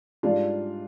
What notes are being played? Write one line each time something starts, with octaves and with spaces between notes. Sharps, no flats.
G#2 G3 D4 F4